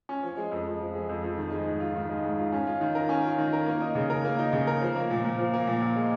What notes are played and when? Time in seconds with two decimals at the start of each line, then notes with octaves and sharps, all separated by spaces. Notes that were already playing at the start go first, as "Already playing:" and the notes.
0.09 C#4
0.23 F3
0.37 G#3
0.52 F2
0.66 F2
0.80 F3
0.95 G#3
1.09 F2
1.24 F2
1.38 D#3
1.52 G#3
1.66 G#2
1.80 F4
1.95 D#3
2.09 G#3
2.23 G#2
2.38 F4
2.52 C#4
2.67 F4
2.81 D#3
2.95 A#4
3.09 C#4
3.24 F4
3.38 D#3
3.53 A#4
3.67 A#3
3.81 D#4
3.95 C#3
4.10 A#4
4.25 A#3
4.39 D#4
4.53 C#3
4.67 A#4
4.81 F3
4.96 A#3
5.10 A#2
5.24 A#2
5.38 F3
5.54 A#3
5.67 A#2
5.82 A#2
5.96 G#3